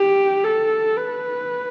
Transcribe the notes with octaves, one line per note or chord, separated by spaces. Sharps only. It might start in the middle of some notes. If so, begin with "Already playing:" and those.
Already playing: G4
A4
B4